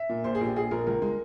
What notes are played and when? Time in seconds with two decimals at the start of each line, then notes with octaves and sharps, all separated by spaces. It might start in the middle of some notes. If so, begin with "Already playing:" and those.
Already playing: E5
0.09 A#2
0.24 A#1 C5
0.35 G#4
0.41 A#1 G4
0.56 A#1 G#4
0.71 A#1 A#4
0.87 C#2 A#4
1.02 G#3